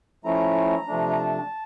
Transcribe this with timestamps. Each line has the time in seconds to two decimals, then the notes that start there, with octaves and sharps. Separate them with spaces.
0.24 F3 A3 C#4 E4 A#5
0.88 C3 F3 A3 D4
1.09 A#5
1.19 A5